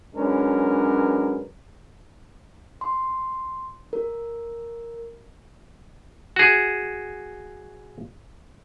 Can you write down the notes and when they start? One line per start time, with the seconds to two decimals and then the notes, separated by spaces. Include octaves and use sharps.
0.15 F#3 G#3 C#4 D4 A#4 B4
2.81 C6
3.93 A#4
6.36 F#4 G#4